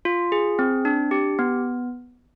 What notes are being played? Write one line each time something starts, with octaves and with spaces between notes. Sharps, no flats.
F4
G#4
C4
D4
G4
B3